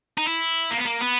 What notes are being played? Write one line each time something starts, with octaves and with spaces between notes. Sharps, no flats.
D#4
E4
A#3
B3
A#3
B3